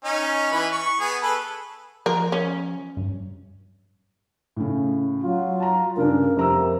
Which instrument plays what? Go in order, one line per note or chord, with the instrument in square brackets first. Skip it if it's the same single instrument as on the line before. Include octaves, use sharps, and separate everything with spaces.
[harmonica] C#4 D#4
E3 B4 B5
C#6
B3 G#4
A4 B4
[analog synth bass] F3 [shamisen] A#4
[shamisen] C#4
[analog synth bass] G2
[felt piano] A2 C#3
[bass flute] F#3 [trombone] F4
[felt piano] A5 A#5
[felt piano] G2 C#3 D4 [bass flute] A#4
[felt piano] F2 A#5 E6 [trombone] C3